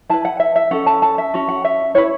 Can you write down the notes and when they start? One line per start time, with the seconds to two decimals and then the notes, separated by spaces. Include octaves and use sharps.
0.09 E4 B4 A5
0.25 F#5
0.40 E5
0.56 E5
0.71 C#4 A4 F#5
0.86 A5
1.02 A5
1.18 E5
1.34 C#4 F#4
1.49 F#5
1.64 E5
1.94 E4 B4 C#5